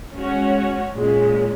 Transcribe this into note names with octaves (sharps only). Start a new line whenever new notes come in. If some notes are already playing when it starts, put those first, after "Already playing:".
G#3 C#4 F#4 C#5
A#2 G#3 C#4